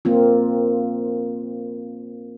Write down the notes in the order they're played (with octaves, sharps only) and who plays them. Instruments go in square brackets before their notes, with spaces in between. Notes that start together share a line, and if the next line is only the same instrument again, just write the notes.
[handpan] A#3 C4 F4